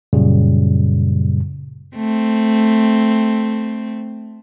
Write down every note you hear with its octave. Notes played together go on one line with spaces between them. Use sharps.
F#2 A#2 C#3 G3
A3 C4